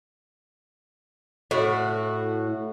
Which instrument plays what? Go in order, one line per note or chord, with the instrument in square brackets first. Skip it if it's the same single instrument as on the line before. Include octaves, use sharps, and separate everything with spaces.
[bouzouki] A2 F#4